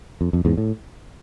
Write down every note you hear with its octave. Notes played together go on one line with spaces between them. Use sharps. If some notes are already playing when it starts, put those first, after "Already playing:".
F2
F2
E2 G#2
A2